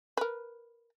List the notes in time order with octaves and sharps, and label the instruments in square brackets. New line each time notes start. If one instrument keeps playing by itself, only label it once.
[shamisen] A#4 B4